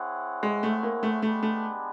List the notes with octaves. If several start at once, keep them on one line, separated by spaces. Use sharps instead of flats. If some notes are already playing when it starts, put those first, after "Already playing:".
Already playing: C4 E4 G#4 C#5 F#5
G#3
A3
A#3
A3
G#3 A3 B3 D4 G4 B4
A3